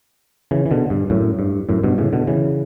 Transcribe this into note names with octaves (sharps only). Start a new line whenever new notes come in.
C#3 E3
E3
B2 D3
G2
F#2 A2
G2
F#2 A2
G2 B2
A2 C#3
B2 D3
C#3 E3